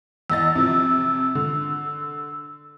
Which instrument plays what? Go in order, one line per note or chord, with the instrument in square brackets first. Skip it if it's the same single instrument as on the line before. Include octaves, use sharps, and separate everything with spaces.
[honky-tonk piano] E2 D#5 A6 [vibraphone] E6
[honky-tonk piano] C3 F3
D3